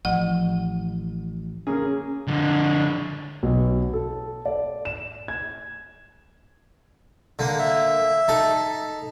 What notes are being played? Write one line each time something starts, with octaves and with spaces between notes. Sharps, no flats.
A1 F3 F#5
C#3 A#3 C#4 G#4
D3 F3
B1
A4
D5
E7
G#6
D3 A#3
E5
D#4 A4